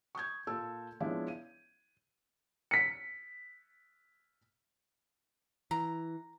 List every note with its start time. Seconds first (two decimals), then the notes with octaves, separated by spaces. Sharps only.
0.15 C#6 D#6 G6 G#6
0.47 A#2 F4 A4 E6
1.00 F3 G#3 B3 C#4 D4 E4
1.28 D#7
2.71 B6 C#7
5.71 E3 A#5